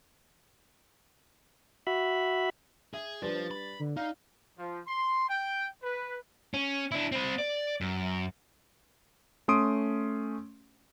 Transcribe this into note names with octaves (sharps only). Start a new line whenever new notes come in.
F#4 E5 B5
G#4 E5
F3 G3 D4 B4 D5 A6
B5
D3
D#4 D5 F5
F3
C6
G5
B4
C#4
D4 E4
C4 B5
D5
F#2
A3 C#4 C6 D#6 D7